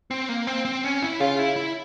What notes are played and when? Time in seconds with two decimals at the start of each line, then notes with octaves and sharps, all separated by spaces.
0.11 C4
0.29 A#3
0.47 C4
0.65 C4
0.84 C#4
1.02 E4
1.20 C#3 F4
1.39 E4
1.56 E4